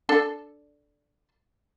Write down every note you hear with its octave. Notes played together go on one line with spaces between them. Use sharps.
D4 A4 A5